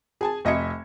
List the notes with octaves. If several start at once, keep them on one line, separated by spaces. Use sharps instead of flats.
G#4 G#5 A5
F1 D#5 E5 G#6 C#7